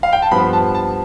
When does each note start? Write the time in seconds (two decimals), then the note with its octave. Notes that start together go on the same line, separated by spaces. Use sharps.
0.03 F5
0.13 G5
0.22 A5
0.31 G2 F3 B3 B5
0.53 A5
0.75 A5